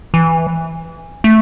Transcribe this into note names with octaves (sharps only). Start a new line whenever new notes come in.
E3
A3